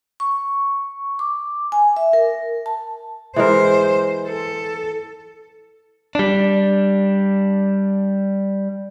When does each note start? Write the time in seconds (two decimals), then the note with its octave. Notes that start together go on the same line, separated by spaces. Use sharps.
0.20 C#6
1.19 D6
1.72 G#5
1.97 E5
2.13 A#4
2.66 A5
3.36 E3 G#3 A#4 C5
4.28 A4
6.15 G3 D4